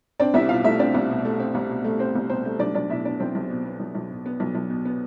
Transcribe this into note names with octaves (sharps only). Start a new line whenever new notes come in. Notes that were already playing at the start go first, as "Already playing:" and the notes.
C4 D4 D5
C2 E4 E5
B2 F4 F5
A3 E4 E5
C4 D4 D5
C2
B2
A3
C4
C2
B2
A3
C4 C5
C2
B2 C4 C5
A3
B1 D4 D5
B1 D4 D5
B2 E4 E5
B3 D4 D5
B1 C4 C5
B1
B2
B3
B1
B1
B2
B3
B1
B1
B2
B3